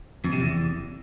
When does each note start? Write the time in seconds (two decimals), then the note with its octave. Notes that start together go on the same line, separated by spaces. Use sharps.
0.24 F2
0.33 C3
0.41 E2